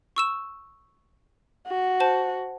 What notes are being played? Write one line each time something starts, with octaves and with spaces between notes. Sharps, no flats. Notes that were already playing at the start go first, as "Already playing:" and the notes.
C#6 E6 E7
F#4
C5 A5